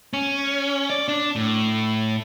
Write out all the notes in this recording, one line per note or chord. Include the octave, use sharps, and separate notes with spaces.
C#4
D5
D4
A2